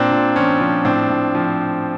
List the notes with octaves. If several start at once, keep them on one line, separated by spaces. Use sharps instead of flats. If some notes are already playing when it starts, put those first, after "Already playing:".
Already playing: A#2 C4 D4
A#2
F3 C#4
F3
A2 C4 D4
A2
F3